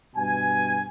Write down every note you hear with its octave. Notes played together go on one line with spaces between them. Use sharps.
G2 B2 G#5